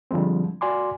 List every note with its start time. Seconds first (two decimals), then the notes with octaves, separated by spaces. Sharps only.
0.11 D3 F3 G3 G#3 C4
0.61 F#4 D5 G#5 C6 D6